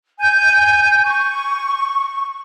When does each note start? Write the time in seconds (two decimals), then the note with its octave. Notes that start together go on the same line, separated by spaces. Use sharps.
0.19 G#5 G6
1.05 C#6